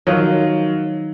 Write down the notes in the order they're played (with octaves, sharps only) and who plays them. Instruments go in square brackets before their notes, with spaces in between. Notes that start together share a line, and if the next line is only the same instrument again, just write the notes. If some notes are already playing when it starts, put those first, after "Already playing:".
[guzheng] D#3 F3 [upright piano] F#3 F4